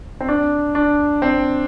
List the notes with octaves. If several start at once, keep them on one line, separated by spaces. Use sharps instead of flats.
C4
D4
D4
C4